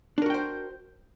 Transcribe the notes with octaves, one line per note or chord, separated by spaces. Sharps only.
D4 F#4 A#4 C5 G5